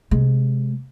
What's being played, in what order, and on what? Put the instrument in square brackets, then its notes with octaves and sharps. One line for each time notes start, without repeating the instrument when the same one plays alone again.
[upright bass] C3 G#3